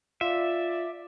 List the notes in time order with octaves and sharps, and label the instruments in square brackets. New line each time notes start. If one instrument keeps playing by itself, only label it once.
[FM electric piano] F4 [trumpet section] D5 [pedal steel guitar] E5